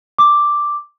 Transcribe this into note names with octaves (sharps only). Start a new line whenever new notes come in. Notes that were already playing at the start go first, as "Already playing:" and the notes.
D6